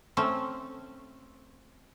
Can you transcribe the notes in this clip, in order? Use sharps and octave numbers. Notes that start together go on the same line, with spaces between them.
A3 C4 C#4